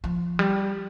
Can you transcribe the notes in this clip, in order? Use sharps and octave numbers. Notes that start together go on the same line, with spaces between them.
F3
G3